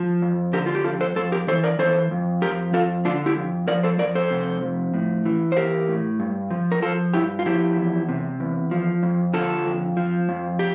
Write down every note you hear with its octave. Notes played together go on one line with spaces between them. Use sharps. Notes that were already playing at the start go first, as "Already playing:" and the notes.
Already playing: F3
F2
D3 G4 A#4
F4
G4
F2 F4 A4
A4 C5
F2 A4 C5
G4 A#4
E3 A4 C5
A#4 D5
E3 A4 C5
F2
F3 G4 A#4
F2 F4 A4
D3 D4 F4
E4 G4
F2
F3 A#4 D5
A4 C5
F2 A#4 D5
A4 C5
C3
F2
A2
E3
C5
E3 G4 A#4
A2
G2
F3
A#4
F3 F4 A4
G2 E4 G4
F4
F3 E4 G4
E2
C3
E2
F3
F2
D3 F4 A4
F2
F3
F2
G4